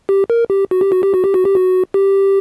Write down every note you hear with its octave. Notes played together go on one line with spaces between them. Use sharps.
G4
A#4
G4
F#4
G4
F#4
G4
F#4
G4
F#4
G4
F#4
G4